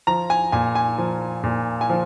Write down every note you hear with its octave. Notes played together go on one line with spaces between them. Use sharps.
F3 A#5
G#5
A#2 G#5
G#5
F3
A#2
G#5
F3